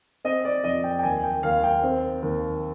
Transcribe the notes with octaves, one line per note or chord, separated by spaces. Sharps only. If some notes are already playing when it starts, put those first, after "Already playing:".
C4 D#5
D5
F2 D#5
G5
G5
D#2 G#5
G5
D#2 F5
G5
C4
D#2